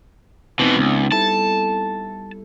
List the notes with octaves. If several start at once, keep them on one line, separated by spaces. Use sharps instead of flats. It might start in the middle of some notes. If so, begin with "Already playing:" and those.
B2 E3 B3 C4 D#4
C#2
G3 E4 A4 A5